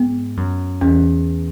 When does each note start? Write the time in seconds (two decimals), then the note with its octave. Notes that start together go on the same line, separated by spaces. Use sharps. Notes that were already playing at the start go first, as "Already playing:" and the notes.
Already playing: G#2 B3
0.37 F#2
0.81 E2 C#4